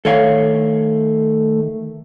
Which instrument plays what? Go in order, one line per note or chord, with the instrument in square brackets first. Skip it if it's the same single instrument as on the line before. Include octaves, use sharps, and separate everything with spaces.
[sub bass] D#3 [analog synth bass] A3 [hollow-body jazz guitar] A4 C#5 F5